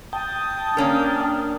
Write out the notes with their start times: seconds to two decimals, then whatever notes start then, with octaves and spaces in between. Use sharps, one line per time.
0.13 G5 A5 D#6
0.77 A#3 C#4 D4 A#4